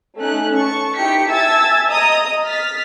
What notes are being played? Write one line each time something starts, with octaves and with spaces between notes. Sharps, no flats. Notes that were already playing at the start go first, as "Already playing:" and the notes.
A3 C#4 D#4 F#6
A5 C#6
D#4 E4 G4 G5 B6 C#7
E5 G#5 A5 E6 G#6 A6
D#5 A#5 D#6
F6 A6 B6